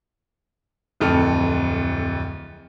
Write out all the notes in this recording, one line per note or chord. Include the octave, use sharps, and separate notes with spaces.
D1 F2 A4 F6